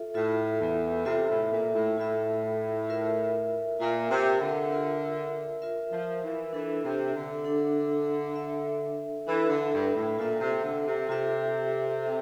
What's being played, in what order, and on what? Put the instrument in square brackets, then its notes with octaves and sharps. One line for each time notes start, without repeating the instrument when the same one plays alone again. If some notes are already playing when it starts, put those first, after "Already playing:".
Already playing: [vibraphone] F4 A4 E5
[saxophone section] A2 [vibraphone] F4 A4 E5
[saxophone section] E2
[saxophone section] C3 [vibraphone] F4 A4 E5
[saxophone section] A2
A#2
A2
[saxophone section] A2 [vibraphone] F4 A4 E5
[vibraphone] F4 A#4 E5
[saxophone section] A#2 [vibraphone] F4 A#4 E5
[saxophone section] C3
D3
[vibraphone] F4 A#4 E5
F4 A#4 E5
[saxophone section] F3
E3
[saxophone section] E3 [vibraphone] D4 A4 E5
[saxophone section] C3
D3
[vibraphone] D4 A4 E5
D4 A4 E5
[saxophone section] E3 [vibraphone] D4 A4 E5
[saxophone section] D3
G2
A2
[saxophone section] A#2 [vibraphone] F4 A4 E5
[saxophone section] C3
D3
C3
[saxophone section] C3 [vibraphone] F4 A4 E5
[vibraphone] F4 A4 E5